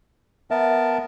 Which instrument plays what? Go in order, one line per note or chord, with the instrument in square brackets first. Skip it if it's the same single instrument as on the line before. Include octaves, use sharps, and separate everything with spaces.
[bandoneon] B3 A#4 A5 [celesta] E5